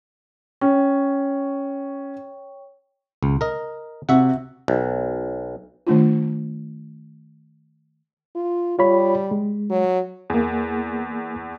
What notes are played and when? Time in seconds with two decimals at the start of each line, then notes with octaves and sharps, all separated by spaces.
0.61 C#4 C#5 G5 C#6
3.23 C#2
3.41 A#4 D#5
4.09 C3 F#4 E5 F#5
4.68 B1
5.87 D#3 A3 D4 F4
8.36 F4
8.79 G3 F4 C#5 B5
9.31 G#3
9.70 F#3
10.30 E2 A#3 G#4